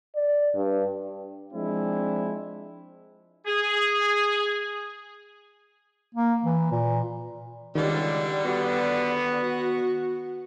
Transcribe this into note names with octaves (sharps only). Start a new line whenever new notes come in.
D5
G2
F3 G#3 C4 D4 E4
G#4
A#3
E3
A#2
C#2 D3 D#3 G3
B3 F#4